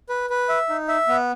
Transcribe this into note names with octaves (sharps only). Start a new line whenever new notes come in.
B4
B4
E5
D#4
E5
B3